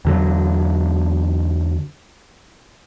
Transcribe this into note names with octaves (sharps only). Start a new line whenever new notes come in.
E2 D3 F#3